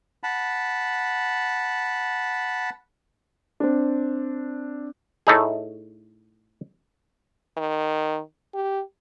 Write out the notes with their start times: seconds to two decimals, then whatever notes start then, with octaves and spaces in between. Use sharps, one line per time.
0.23 F#5 A5 B5
3.60 C4 D4
5.27 A2 A3 D#4 G#4
7.57 D#3
8.54 G4